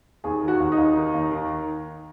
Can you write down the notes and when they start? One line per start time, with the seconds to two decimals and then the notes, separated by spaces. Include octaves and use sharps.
0.24 D#2 G#4
0.42 D#3
0.48 F#4
0.60 D#2
0.72 D#4
0.78 D#2
0.96 D#3
1.14 D#2
1.31 D#3